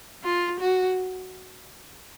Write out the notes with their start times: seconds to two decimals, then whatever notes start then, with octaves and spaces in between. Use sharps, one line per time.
0.24 F4
0.60 F#4